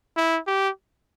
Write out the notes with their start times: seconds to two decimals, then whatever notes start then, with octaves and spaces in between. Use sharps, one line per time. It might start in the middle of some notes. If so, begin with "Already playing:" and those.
0.17 E4
0.47 G4